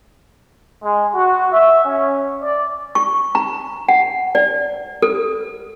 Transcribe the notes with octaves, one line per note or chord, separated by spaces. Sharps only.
G#3
F#4
E5
C#4
D5
C#6
A#5
F#5
D5
A4